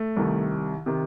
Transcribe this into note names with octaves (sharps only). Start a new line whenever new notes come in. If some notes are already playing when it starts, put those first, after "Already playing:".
Already playing: A3
C2 C3 D#3
C3 D#3